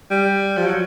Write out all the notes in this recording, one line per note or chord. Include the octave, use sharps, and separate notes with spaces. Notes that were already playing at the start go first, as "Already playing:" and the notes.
G3
F3
F#3